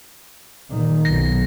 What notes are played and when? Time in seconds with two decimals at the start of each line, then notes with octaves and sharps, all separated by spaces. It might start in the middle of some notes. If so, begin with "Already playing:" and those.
0.70 A#2 D#3
1.05 B1 A#6